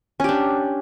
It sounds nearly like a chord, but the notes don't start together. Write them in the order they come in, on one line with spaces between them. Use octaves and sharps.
C#4 G4 D4